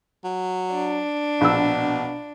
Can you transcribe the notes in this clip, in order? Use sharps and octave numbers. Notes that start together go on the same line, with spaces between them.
F#3
D4
A#1 B2 E6